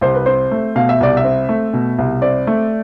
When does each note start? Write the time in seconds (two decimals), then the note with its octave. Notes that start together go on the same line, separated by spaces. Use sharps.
0.01 C2 C5
0.15 B4
0.26 C4 C5
0.51 A3
0.75 B2 F5
0.89 E5
1.01 C2 D5
1.17 E5
1.24 C4
1.49 A3
1.73 B2
1.98 C2
2.22 C4 D5
2.47 A3